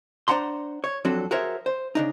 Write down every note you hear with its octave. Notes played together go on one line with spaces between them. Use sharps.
D4 C5 F#5 A#5 C6
C#5
F2 F#3 C4 D4 F#4 A4
F#4 G#4 A#4 C5 C#5 E5
C5
C#3 D4 D#4